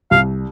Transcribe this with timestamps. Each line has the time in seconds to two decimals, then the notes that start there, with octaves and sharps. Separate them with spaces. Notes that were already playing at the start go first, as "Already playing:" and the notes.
0.11 C2 F5